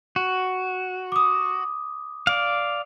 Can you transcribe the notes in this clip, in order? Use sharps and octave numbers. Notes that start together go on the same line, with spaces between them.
F#4
D6 D#6
D5 F5